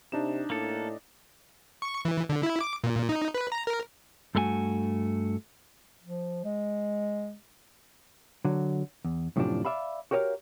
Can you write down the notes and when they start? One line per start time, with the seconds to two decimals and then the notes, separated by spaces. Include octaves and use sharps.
0.12 C3 D4 D#4 E7
0.50 A2 A#3 A4
1.82 C#6
2.05 E3
2.29 D3
2.43 E4
2.61 D6
2.84 A#2
3.09 D#4
3.35 B4
3.52 A#5
3.67 A#4
4.35 G2 A3 E4 F#4 G#5
6.04 F3
6.44 G#3
8.45 D3 F#3
9.05 E2
9.36 F#2 A2 C3 E3 F3 D4
9.65 D5 E5 F5 B5
10.11 F#4 G4 A#4 C#5 D#5 F5